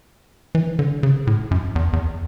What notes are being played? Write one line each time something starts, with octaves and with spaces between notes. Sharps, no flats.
E3
D3
C#3
A2
F#2
E2
E2